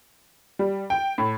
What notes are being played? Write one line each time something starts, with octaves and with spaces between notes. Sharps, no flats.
G3
G5
A2